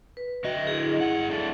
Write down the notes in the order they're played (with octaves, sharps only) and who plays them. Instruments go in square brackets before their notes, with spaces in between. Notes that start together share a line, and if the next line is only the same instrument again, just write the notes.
[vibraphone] B4
[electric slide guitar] D3 D#5 [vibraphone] F#4 E5 G5
[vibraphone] E4 G#4
[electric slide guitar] G2 F#5
D4 E4 A4